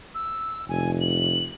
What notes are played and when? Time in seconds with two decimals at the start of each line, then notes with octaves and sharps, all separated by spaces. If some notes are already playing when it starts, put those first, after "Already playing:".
0.14 E6
0.69 F1 G#5
1.00 F#7